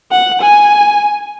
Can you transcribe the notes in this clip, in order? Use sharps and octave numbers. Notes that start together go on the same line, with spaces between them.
F#5
G#5